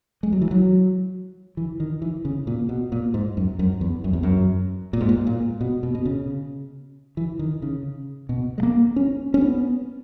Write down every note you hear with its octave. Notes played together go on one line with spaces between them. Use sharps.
G#3
F#3
E3
F#3
E3
D#3
E3
C#3
A#2
B2
A#2
G#2
F#2
F#2
E2
F#2
E2
F#2
A#2
G#2
A#2
A#2
B2
B2
B2
C#3
E3
D#3
C#3
B2
G#3
A#3
C#4
C#4
B3